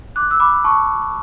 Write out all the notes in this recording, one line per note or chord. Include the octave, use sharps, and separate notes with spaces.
D6 F#6
E6
B5 D6
A5 C#6